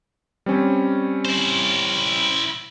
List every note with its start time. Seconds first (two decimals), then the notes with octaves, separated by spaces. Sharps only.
0.46 G3 C4 C#4
1.25 E4 C5